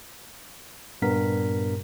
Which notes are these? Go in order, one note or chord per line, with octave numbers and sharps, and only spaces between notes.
G2 A#2 B3 A#4 B6